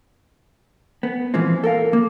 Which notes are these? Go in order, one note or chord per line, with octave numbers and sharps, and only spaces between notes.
B3
A#2 E3 F3 G#3 C4
A4 A#4 F5
A#3